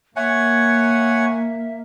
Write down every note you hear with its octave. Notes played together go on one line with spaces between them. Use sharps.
A#3 C#5 E5 F#5 G#5